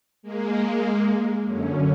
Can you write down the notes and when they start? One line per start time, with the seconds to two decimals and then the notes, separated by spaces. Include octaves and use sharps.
0.23 G#3 A#3
1.45 F#2 D3 C#4